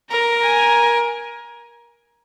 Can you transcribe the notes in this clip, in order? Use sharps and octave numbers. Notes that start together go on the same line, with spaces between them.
A#4 A#5
G#5